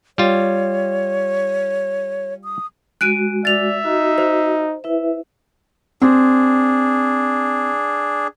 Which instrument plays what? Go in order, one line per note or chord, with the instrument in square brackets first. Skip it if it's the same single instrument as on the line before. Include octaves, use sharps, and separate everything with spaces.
[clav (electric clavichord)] G3 F4 [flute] C#5
[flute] D#6
[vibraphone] G#3 F#4 [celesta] F#6 D7 D#7
[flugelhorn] D5 [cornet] E5 [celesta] A6 F7
[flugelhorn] D#4 [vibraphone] F#4
[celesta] C5
[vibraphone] E4 B4 E5
[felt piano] C4 [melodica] D4 G#4